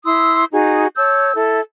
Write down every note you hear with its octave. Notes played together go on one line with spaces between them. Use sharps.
E4 C6 D#6 E6
D#4 F#4 G#4
C#5 A5 E6 G6
E4 A4